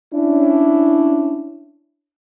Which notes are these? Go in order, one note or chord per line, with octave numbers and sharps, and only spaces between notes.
C#4 D4 E4